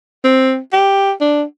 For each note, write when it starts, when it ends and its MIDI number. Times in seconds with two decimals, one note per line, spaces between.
0.24 0.58 60
0.73 1.11 67
1.21 1.43 62